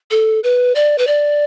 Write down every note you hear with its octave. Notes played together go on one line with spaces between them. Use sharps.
A4
B4
D5
B4
D5